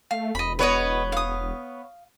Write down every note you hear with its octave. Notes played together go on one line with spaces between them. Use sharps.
A3 F5
E1 D#5 B5
B3 B4 C#5 D#5
F5 D#6